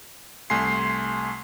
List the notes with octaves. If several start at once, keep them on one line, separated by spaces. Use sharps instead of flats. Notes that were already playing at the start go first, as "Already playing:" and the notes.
C2 A3 G#5 C6 C7